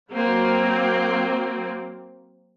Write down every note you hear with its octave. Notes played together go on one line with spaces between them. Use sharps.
F#3 A#3 C4